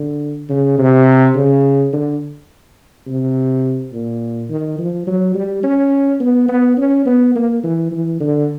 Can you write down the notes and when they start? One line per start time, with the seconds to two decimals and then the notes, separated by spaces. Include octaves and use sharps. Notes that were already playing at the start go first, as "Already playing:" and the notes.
Already playing: D3
0.49 C#3
0.78 C3
1.36 C#3
1.93 D3
3.07 C3
3.92 A#2
4.50 D#3
4.78 F3
5.07 F#3
5.34 G3
5.63 C#4
6.20 B3
6.49 B3
6.77 C#4
7.06 B3
7.35 A#3
7.64 E3
7.91 E3
8.20 D3